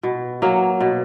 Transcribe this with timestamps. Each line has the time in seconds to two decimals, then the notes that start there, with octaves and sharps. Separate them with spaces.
0.03 B2
0.42 F#3 A#3
0.81 B2